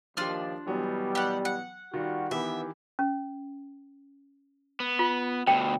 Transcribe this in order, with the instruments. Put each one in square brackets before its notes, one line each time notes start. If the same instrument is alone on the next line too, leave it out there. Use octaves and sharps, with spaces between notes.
[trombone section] D#2 [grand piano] F3 G4 [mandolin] D4 F4 F6
[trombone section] B2 G3 [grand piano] E3 F#3 B3
[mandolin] G4 F#5
F#5
[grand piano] D#3 F4 [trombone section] G3 F#4
[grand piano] D#3 E3 G4 [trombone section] B3 [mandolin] E5
[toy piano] C#4
[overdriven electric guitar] B3
[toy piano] F4
[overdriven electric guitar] D2 B2 [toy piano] G5